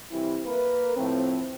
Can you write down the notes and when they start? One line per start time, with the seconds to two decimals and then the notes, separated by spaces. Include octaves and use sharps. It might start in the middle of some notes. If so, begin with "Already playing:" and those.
0.11 C2 E3 G3 C4 E4
0.45 A#3 A#4 B4
0.97 A2 F3 C4